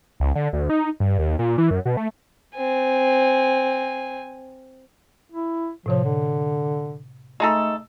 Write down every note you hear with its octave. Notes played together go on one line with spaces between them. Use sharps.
C#2
D3
D2
D#4
G2
D#2
A#2
E3
F#2
B2
A3
C4 G#5
E4
A2 C3 F3 C#5
D3
G#3 A3 D#4 A4